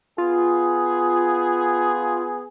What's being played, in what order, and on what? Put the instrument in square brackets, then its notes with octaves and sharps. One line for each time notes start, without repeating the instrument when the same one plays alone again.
[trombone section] B3 G#4 [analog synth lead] F4